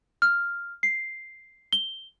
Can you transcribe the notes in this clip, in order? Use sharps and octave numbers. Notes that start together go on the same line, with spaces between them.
F6
C7
G7